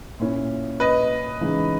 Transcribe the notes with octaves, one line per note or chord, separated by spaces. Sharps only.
A#2 A#3 C#4 E4
B4 D#5
C#3 E3 G#3 D#4